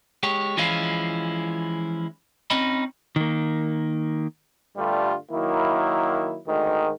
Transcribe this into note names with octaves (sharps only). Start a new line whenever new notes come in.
G#3 G4 C#5
E3 F3 G#3 C#4 E4 F4
C4 C#4 D#4 D#5 B5
D#3 A#3
G2 D3 G3 A3 F4
D#3 F#3 A#3 E4
D2 G#2 D#3